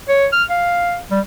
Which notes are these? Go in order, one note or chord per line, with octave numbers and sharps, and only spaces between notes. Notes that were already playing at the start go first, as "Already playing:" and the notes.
C#5
F6
F5
G3